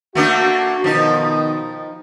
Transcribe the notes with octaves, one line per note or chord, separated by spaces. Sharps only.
A3 A#3 D4 F#4
B2 D#3 F3 D#4